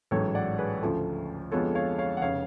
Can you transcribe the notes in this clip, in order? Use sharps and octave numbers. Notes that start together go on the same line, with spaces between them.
A1 G#2 F#3 A4 C#5
D5 F#5
G#4 B4
D2 C#3 F3 A3 F4
F2 D3 G#3 B3 F4 A4 C#5
C#5 F5
C#5 F5
F#5
F1 C#3 C#5 F5